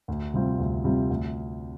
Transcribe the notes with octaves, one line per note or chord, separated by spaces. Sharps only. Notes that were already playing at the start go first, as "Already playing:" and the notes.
D2
C3 G3 C4 F4
D2
C3 G3 C4 F4
D2